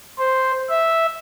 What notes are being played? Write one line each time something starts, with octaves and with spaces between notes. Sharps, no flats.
C5
E5